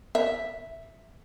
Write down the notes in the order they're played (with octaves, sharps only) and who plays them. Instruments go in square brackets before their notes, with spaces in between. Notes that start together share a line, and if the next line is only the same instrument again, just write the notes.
[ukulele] E5